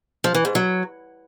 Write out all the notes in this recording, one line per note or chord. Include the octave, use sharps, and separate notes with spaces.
F3
E3
G#2
F#3